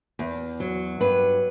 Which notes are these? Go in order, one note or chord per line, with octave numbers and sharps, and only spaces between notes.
E2
F#3
G2 B4